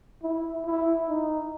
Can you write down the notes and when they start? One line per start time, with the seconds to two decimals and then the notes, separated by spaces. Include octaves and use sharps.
0.23 E4
0.66 E4
1.08 D#4